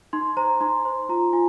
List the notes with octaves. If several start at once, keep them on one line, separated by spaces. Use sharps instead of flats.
D#4 C6
C5 A#5
D#4 C6
C5 C6
F4 A#5
F4 G#5